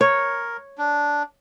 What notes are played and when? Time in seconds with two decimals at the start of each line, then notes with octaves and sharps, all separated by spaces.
0.01 A#4 C#5
0.78 D4